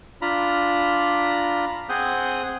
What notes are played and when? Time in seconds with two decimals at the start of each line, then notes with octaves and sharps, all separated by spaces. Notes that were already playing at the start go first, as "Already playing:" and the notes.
0.22 D4 F4 A#5 B5
1.89 C4 G#4 F#5 D#6 G6